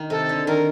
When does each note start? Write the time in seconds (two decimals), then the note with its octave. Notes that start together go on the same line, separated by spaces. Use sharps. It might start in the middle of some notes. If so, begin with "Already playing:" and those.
Already playing: D#3
0.10 C3 A4
0.29 D3
0.47 D#3 A#4